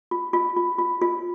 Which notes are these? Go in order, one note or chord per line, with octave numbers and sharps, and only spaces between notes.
F4
F4
F4
F4
F4